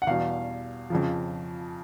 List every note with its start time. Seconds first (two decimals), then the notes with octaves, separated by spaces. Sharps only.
0.02 F#5
0.07 E2 B2 G3 F5
0.90 F2 C#3 F3